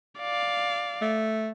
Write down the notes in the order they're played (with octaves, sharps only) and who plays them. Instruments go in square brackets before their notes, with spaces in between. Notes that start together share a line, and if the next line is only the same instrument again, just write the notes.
[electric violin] D5 F5
[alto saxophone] A3